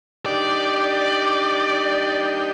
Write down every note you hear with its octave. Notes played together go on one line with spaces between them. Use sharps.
D4 D#4 G4 D5